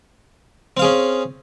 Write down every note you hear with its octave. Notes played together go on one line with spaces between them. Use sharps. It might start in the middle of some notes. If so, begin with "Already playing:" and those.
C4 C#4 G#4 F5